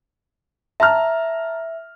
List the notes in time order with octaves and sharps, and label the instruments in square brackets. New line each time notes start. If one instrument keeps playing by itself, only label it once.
[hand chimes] E5 [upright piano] A5 A#5 F6